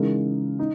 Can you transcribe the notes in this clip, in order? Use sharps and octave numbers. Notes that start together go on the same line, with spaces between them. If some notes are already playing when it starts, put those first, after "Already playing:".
Already playing: C#3 E3 G#3 D#4 A#4
D#4